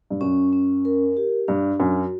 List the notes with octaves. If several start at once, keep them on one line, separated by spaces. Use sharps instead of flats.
G2
F#2 C#4
C#4
A#4
G4
G2 D4
F#2 F#4